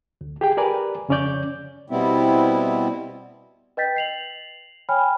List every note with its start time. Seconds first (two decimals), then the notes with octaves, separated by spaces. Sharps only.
0.21 D2
0.41 G4 G#4 G5
0.57 G4 A#4 B4 D5 G#5
1.09 F2 C#3 C#4 C#5 D5 G6
1.90 B2 G3 B3 C4 E4
3.77 B4 D#5 G5 G6 A6 B6
3.96 C7 F7 F#7
4.89 C#5 G5 G#5 B5 F6